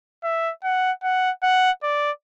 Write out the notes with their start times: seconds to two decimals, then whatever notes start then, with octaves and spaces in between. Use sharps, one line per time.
0.24 E5
0.64 F#5
1.03 F#5
1.43 F#5
1.83 D5